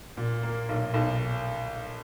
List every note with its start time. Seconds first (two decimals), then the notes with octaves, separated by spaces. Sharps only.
0.17 A#2
0.43 A#3
0.69 B1
0.94 B1